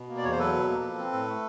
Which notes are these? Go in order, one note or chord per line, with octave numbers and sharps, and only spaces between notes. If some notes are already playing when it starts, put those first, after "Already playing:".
Already playing: B2
A#3
D5
E2 C#5
C5
F#3 A4 B4
B2
A#3
F3
C4
A2
A3